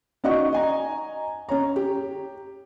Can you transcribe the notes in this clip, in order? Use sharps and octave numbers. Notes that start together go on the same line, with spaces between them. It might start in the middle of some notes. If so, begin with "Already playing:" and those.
C#4 D#4 F#4 D5 D#5 C#6
D#5 G#5 A#5
C#4 C#5 A#5
G4